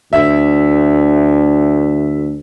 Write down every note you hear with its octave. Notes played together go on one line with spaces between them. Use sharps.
D2 E5